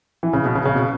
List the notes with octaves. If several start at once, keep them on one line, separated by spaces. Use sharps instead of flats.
E3
C#3
B2
C#3
C#3
B2